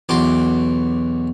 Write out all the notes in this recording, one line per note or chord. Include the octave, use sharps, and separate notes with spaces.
B1 E2 F#4 C6 D6